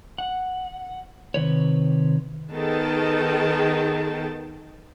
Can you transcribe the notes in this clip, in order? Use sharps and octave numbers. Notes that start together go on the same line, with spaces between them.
F#5
C3 D#3 B4 C#5
D#3 B3 G#4 A4 G5 A5